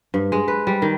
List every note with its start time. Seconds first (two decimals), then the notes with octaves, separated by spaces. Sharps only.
0.14 G2
0.32 G#3
0.48 B4
0.67 G3
0.82 D#3